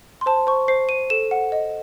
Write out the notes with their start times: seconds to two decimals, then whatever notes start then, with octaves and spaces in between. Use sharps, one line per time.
0.21 C6
0.26 C5 A5
0.47 C5 C#6
0.68 C5 C7
0.89 C5 D#7
1.10 A4 E7
1.31 F#5
1.52 D#5